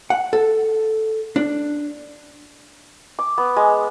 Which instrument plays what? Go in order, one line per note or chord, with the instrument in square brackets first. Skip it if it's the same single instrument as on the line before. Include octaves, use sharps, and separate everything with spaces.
[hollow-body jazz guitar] F#5
A4
D4
[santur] D6
B3
G#3